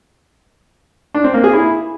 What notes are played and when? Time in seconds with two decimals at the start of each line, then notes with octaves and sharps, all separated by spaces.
1.14 D4
1.24 C4
1.34 A#3
1.44 G#4
1.53 E4